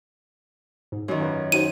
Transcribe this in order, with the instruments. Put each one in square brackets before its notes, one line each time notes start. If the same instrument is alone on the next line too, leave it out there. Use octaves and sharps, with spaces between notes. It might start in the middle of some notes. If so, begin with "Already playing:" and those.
[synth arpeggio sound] G#2
[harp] F#2 D#3
[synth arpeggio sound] F4 A#4 B4
[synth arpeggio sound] D#4 F#4 C5 [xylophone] D#7